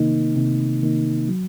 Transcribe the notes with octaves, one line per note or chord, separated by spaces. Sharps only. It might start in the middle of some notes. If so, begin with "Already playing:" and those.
Already playing: C3 D#3 A#3 D#4
C3
D#3 A#3 D#4
F#3